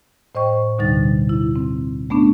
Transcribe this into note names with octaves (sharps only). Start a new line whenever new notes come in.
A2 C5 D#5 G5 C#6
D2 B2 D3 G3 D#4 A6
E4
C4
A3 B3 C#4 D4